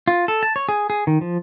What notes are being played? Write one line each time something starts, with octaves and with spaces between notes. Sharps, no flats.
F4
A4
A5
C#5
G#4
G#4
D#3
F3